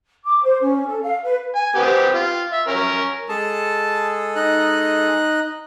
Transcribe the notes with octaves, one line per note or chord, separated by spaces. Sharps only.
D6
C5
C#4
A4
F5
B4
G#5
B3 C4 G4
F4
E5
C#4 A#4
G#3 G#4 A4 A5
D#4 F#6